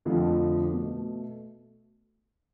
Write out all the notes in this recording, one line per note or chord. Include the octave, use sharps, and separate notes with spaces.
F2 D3 F3 A3
B2 A3